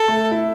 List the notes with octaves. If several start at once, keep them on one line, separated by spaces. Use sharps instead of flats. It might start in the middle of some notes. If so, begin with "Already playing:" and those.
Already playing: A4
A3
E4